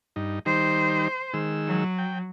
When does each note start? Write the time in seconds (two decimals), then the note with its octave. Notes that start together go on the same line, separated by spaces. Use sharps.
0.16 G2 D#4
0.46 D#3 G3 D#4 C5
1.34 D#3 G#3 E6
1.67 F#3
1.98 G5